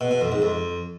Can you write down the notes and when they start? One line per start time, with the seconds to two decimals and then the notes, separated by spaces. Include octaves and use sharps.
0.01 B2
0.11 B2
0.21 F2
0.32 G#2
0.42 F2